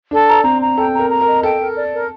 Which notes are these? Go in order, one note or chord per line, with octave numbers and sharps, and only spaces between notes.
D4 A4
A#5
C4 A#5
A#5
A4 G5
A#5
A#4
A#5
A#4
D#5
A4 G5
A#4
D5
A#4